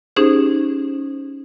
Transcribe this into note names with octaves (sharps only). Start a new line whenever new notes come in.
C#4 D#4 G4 G#4 C5